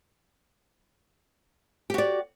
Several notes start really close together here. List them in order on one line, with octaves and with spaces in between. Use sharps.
G4 F#4 D5